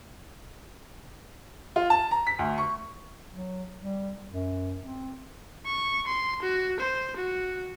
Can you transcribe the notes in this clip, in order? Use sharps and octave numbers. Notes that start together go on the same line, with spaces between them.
F4
A5
A#5
B6
D2
C#6
F#3
G3
F#2
C4
C#6
C6
F#4
C5
F#4